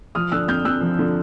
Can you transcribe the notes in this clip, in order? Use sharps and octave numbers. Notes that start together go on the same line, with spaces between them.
F3 D#6 F6
D3 E6 F#6
F2 F6 G6
F2 E6 F#6
F3
D3